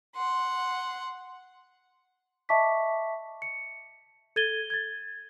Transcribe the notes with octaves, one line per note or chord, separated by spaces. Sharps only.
F#5 C6
D#5 E5 A5 C#6 D6 B6
C#7
A4 G#6 A6 D#7 G7
G#6 A6